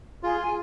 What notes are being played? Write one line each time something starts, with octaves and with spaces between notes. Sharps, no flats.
F4 G#4
G#5